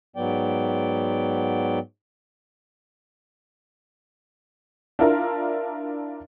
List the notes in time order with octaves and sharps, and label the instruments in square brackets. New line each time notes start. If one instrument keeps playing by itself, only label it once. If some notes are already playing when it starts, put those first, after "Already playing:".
[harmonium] G#2 F#3 B3 D5 G5
[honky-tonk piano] D4 E4 F4 A#4